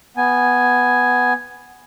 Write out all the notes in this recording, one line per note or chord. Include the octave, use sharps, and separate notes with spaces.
B3 G#5